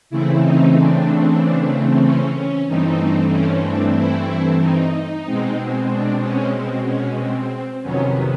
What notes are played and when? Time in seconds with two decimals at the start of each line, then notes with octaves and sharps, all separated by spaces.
0.10 C#3 E3 A3 C4 E4
0.42 D#4
0.74 D4
2.03 C#4
2.36 C#4
2.67 G2 E3 A3 C4 D#4
3.32 C#4
3.63 D4
3.97 E4
4.61 D#4
5.25 B2 G#3 C4
5.90 D4
6.21 C#4
6.54 C4
6.85 C#4
7.18 C4
7.82 F2 C3 D#3 F#3 B3 C#4